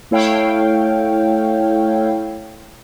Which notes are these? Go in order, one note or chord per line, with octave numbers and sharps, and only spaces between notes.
A3 E4 A4 C#5 F5 G5